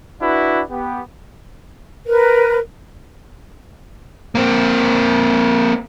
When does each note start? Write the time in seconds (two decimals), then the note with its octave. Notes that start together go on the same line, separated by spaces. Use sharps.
0.22 D4 E4 F#4 B4
0.70 B3 G4
2.06 A#4 B4
4.35 A#3 C4